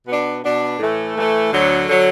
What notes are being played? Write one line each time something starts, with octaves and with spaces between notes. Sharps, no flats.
B2 B3 D4
B2 B3 D4
A2 E3 A3
A2 E3 A3
D2 D3 F#3
D3 F#3